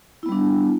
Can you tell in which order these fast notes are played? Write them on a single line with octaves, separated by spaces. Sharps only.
E4 B3 G3 D4